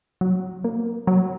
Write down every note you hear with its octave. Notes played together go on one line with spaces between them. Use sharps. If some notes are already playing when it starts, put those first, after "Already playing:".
F#3
A#3
F#3